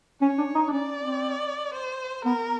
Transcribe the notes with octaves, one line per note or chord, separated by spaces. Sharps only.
C#4 C#5
D4
D#4
D4
C#4 D5
C4
C5
B3 A#4